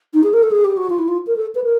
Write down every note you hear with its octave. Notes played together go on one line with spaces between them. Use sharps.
D#4
G#4
A#4
A4
G#4
G4
F#4
F4
E4
F4
A#4
A4
B4
A#4